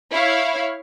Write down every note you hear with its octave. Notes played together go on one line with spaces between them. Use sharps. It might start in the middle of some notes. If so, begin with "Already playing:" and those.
E4 C#5 F5